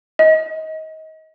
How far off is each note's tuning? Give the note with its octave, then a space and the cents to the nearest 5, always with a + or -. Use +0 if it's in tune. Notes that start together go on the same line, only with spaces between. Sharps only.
D#5 +25